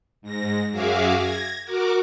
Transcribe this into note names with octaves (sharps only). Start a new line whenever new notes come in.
G#2 A#6
F#2 F#4 G#4 E5 F5 D6
G#6 A#6
F#4 A#4 D6